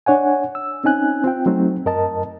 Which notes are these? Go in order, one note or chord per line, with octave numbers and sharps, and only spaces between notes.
D4 C#5 F#5 G#5
E6
C4 C#4 D#4 G#5 F#6
C4 F4 G5
F#3 A3 C4 D#4
F#2 A#4 D#5 A5